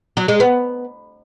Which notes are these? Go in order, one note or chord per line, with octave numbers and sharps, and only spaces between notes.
F#3
G#3
B3